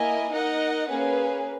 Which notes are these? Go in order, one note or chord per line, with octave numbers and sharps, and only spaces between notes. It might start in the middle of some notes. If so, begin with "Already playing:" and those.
Already playing: A#3 E4 A#4 D#5 G#5
D#4 A#4 D#5 F#5
A#3 C#4 G#4 B4